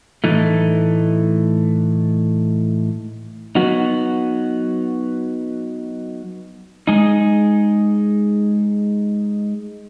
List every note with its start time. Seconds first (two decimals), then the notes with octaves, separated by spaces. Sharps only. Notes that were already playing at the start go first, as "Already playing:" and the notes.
0.24 A2 E3 A3 D#4
3.55 F#3 B3 D#4 F#4
6.87 G#3 D#4 G#4